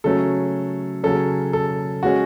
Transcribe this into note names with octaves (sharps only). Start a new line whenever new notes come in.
C#3 F#3 A3 C#4 A4
C#3 F#3 C#4 A4
A4
G#3 C#4 F#4